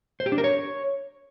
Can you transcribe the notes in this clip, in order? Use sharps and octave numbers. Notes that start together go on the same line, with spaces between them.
C5
G4
D4
A#4
C#5